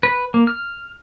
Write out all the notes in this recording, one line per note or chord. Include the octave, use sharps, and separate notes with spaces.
B4
A#3
F6